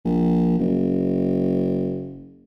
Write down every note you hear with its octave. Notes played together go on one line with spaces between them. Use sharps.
A#1
F#1